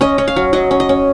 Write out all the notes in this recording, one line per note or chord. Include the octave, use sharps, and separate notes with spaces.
C#4 D#5
C#4
F5
F#3
F#3 D#5
C#4
D#5
C#4